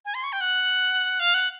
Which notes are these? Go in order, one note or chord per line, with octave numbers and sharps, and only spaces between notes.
G#5
C6
C#6
G5
F#5
F5
F#5